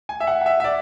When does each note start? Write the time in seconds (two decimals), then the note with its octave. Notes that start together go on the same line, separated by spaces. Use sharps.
0.09 G#5
0.20 E5
0.27 F#5
0.41 F#5
0.46 E5
0.60 E5
0.64 D5